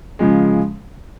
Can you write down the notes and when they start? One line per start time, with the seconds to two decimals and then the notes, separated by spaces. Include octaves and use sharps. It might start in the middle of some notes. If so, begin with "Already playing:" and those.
0.19 C#3 F3 G#3